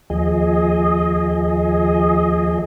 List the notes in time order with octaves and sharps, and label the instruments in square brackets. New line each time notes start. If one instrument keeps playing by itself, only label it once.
[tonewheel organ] D#2 F3 G#4 D#5